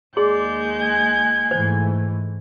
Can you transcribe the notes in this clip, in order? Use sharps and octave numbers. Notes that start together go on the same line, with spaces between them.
D#2 G#3 G#4 D5 C6 G6
G#5
G#2 E3 A3 C5